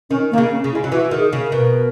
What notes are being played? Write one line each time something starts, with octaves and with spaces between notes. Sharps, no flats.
D#3 C#4
D#3 A#3
C#3
C#4
C#3
E4
G#3
F#3
E3 F#4
D#3
G#4
C#3
A#4
B2